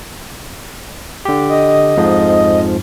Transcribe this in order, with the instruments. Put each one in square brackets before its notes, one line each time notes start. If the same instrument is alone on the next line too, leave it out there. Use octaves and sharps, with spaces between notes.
[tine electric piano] D3 G4
[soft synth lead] D#5
[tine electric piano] F2 G#2 F3